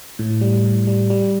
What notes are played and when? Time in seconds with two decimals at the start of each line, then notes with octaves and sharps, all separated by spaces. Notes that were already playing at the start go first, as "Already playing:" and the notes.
0.19 A2
0.41 G3
0.64 A2
0.87 G3
1.10 G3